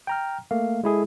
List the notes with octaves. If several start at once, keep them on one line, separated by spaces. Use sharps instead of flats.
G5 A#5 F6
A3 A#3 F5
G#3 E4 G#4 A4